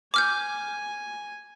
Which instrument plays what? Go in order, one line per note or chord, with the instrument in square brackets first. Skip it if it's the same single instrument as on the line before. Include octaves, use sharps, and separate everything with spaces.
[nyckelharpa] G#5 [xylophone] D6 F6 G6